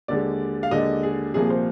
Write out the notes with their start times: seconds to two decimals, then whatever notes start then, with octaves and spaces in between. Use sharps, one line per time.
0.08 D#2 D3 G#3 D5
0.63 F5
0.71 D#2 D3 G#3 D#5
1.03 G#4
1.34 C2 A#2 F3 A#3 G#4
1.50 C5